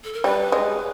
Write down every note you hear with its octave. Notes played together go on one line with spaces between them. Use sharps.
A4
A#4
G3 B4
G#3